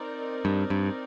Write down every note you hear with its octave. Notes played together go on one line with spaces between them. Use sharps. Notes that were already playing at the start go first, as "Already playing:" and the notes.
Already playing: C4 D#4 A#4 D5
G2
G2